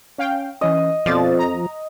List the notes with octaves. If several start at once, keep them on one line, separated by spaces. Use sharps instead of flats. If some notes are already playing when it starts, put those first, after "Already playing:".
C#4 F5 G5
E3 C#4 D#5
F2 B2 F3 D5 A6
A#5